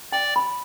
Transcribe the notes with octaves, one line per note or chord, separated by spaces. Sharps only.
D5 G5
B5